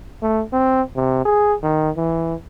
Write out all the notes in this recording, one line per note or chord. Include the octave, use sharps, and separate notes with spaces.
A3
C4
C3
G#4
D#3
E3